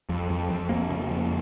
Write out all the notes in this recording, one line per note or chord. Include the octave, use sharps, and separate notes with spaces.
F2
F2
F2
F2 A#3
C#3
F2